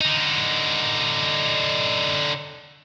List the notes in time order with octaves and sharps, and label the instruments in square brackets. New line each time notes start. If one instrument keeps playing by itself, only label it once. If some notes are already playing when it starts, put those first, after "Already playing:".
[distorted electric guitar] D3 D#4